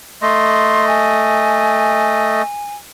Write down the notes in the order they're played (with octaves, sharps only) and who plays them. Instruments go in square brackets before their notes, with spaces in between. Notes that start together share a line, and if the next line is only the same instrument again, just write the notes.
[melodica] A3 D#5 [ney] C6
[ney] G#5